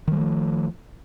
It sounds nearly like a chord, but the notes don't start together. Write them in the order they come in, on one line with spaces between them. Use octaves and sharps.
D#3 G3 A3 F3